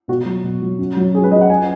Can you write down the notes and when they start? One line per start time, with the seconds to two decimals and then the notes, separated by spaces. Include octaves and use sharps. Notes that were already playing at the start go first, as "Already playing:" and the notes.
0.08 B2 F#4
0.26 F#3
0.44 B2
0.62 F#3
0.79 F#2
0.97 F#3
1.14 F#2 G#4
1.23 B4
1.31 F#3 D#5
1.41 F#5
1.49 F#2 G#5